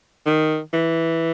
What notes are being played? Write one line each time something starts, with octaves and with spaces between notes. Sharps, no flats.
D#3
E3